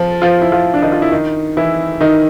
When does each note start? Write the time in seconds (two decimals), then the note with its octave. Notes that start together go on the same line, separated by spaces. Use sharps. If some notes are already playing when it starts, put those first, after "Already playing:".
Already playing: F3 F4
0.22 F3 F4
0.42 E4
0.52 F3 F4
0.74 D4
0.82 D#3 D#4
0.92 F4
1.02 E4
1.11 D#3 D#4
1.57 E3 E4
2.00 D#3 D#4